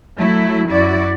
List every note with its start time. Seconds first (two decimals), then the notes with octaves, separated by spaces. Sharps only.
0.17 F#3 A3 E4
0.69 F#2 E4 F#4 D5